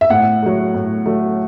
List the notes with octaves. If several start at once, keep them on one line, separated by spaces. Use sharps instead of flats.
E5
A2 F#5
F#3 A3
A2
F#3 A3